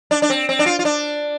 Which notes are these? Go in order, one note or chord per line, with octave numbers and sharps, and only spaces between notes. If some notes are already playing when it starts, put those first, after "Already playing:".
D4
D4
C4
C4
D4
F4
F4
D4